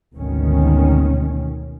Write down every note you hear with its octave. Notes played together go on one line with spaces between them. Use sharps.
G#1 D2 B2 D#3 C#4